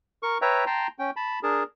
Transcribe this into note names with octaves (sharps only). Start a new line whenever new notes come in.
A#4 C#6
B4 C#5 E5 G5 A#5
G5 A5 A#5 C6
C#4 G5
A5 B5
D4 G#4 A#4 A5